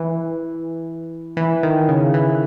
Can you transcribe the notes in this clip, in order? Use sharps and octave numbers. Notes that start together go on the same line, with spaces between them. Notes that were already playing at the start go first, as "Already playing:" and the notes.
Already playing: E3
E3
D#3
C#3
E3